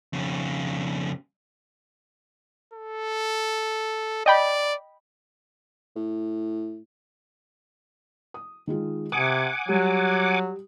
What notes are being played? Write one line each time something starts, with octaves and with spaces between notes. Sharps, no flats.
F2 C#3
A4
D5 D#5 G5 B5
A2
D#6
D#3 G#3 F4
C3 F#5 G#5 D6 D#6
F#3 G3 G4